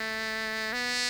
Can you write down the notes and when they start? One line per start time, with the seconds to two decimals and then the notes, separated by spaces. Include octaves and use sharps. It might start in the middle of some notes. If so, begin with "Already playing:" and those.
Already playing: A3
0.73 B3